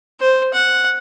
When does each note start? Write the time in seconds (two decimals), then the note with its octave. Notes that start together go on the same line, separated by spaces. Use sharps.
0.20 C5
0.53 F#5